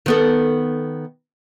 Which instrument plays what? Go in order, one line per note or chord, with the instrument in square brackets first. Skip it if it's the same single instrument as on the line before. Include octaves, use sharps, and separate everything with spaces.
[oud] D#3 B3 A4